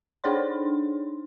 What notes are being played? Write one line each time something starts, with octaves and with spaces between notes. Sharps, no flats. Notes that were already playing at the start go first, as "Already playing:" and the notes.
D4 D#4 G#4 C5 C#5 C6